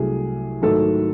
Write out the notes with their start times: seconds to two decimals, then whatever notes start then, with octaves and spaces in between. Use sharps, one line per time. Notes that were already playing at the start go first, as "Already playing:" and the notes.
Already playing: C2 C3 F#3 A3 G#4
0.62 G#2 D#3 F#3 A3 A4